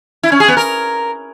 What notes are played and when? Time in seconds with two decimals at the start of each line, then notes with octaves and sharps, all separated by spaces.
0.23 E4
0.32 C#4
0.40 G#4
0.48 B3
0.57 A#4